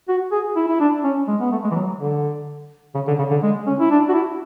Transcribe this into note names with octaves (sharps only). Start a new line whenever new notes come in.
F#4
G#4
E4
E4
D4
C#4
G#3
B3
A3
G#3
E3
F#3
D3
C#3
D3
C#3
D3
G#3
C#4
E4
D4
F#4
E4